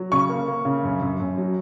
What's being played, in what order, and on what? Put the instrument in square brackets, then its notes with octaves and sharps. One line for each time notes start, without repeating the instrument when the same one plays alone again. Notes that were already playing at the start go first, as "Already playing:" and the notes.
Already playing: [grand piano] F#3
[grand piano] C#3 [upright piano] C#6
[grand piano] A#3
A#3
C#3
F#2
F#2
F#2
F#3